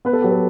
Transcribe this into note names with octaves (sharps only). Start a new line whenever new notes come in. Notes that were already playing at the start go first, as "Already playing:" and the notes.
B3 B4
A4
F#3 G4
A4